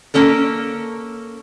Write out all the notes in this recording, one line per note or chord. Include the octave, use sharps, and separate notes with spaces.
A#3 C#4 A4 A#4